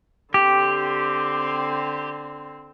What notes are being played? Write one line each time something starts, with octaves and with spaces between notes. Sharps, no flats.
D3 C4 G4